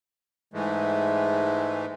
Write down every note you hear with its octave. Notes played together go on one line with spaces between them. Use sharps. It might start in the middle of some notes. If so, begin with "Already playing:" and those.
G#2 E3 G#3 A3